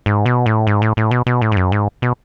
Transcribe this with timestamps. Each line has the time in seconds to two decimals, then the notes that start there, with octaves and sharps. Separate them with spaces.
0.06 G#2
0.26 B2
0.46 A2
0.67 G#2
0.82 A2
0.97 A2
1.11 B2
1.27 B2
1.42 A2
1.52 G#2
1.57 F#2
1.72 G#2
2.02 B2